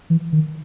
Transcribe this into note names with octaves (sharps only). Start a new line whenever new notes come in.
E3
D#3